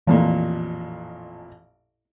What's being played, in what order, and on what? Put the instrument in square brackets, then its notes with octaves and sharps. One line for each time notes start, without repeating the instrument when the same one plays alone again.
[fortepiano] A1 F2 A#2 [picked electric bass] E3